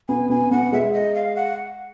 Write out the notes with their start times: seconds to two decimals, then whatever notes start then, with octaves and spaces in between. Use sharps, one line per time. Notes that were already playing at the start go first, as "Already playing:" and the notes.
0.09 B3 G#5
0.30 B3 G#5
0.51 B3 F#5
0.72 G#3 E5
0.93 D#5
1.14 F5
1.36 F#5